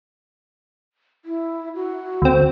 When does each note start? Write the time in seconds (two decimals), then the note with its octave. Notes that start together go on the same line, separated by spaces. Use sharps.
1.25 E4
1.75 F#4
2.22 D2 C4